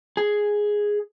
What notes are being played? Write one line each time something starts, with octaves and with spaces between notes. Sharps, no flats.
G#4